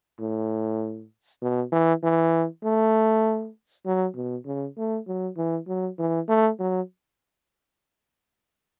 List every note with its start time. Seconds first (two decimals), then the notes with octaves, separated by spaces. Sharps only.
0.19 A2
1.42 B2
1.72 E3
2.03 E3
2.63 A3
3.86 F#3
4.15 B2
4.46 C#3
4.77 A3
5.07 F#3
5.37 E3
5.67 F#3
5.99 E3
6.28 A3
6.59 F#3